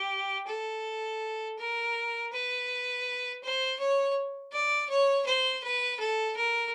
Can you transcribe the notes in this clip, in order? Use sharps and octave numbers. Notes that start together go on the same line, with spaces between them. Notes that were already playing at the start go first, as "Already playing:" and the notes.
Already playing: G4
A4
A#4
B4
C5
C#5
D5
C#5
C5
B4
A4
A#4